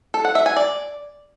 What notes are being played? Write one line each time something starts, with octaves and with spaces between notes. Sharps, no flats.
A4
F#5
E5
G#5
D5